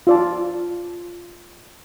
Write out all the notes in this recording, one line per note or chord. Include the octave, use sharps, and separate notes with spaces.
F4 D5 A5